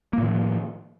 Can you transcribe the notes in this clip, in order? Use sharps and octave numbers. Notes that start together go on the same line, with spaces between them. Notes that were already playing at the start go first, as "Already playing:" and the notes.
A2 D#3 F3 A#3